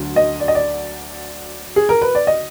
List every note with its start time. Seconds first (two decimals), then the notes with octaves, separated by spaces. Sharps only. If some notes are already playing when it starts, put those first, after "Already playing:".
Already playing: D2 D3 F#3
0.16 D#5
0.40 D5
0.48 D#5
0.55 D5
1.76 G#4
1.89 A#4
2.01 B4
2.15 D5
2.27 D#5